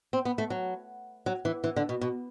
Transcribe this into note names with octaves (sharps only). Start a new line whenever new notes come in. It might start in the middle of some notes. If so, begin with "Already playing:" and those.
C4
B3
A3
F#3
F#3
E3
E3
D3
B2
B2